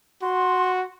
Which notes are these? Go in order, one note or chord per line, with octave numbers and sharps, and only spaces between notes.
F#4 C6